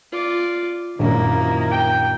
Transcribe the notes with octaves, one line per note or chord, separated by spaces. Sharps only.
F4 D5
A#1 F#2 D#3 A#3 E4
G5